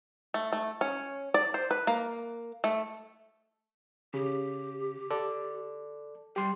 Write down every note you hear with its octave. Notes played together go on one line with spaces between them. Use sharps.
A3
A3
C#4
D5
C5
B4
A#3
A3
C#3 G4
A4 D5
G3 G4 C6